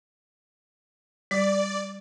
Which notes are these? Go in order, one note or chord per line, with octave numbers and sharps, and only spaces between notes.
G3 D5